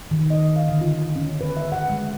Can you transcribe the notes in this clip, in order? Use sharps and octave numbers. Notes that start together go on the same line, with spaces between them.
D#3
D#5
F5
D3
F4
C#4
B4
E5
F#5
G#3